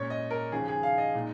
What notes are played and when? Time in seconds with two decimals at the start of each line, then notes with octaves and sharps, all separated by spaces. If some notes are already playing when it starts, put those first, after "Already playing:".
Already playing: A#2 G#3 C#4 C#5
0.10 D#5
0.31 A#4
0.52 D#2 C#3 F3 C#4 G#4
0.68 G#4
0.83 F5
0.98 D#5
1.14 A#2 G#3 D#4